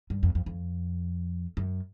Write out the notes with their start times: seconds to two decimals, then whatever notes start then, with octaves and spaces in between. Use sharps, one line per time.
0.10 G2
0.23 F2
0.35 F2
0.46 F2
1.57 F#2